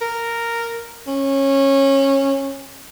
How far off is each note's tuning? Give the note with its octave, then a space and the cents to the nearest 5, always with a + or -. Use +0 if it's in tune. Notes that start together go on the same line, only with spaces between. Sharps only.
A#4 -5
C#4 -20